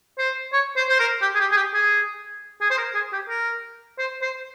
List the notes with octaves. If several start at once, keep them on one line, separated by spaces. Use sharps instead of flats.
C5
C#5
C5
C5
A#4
G4
G#4
G4
G#4
G4
G#4
G#4
C5
A#4
G#4
G4
A#4
C5
C5